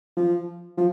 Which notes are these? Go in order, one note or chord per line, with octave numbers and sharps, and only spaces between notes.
F3
F3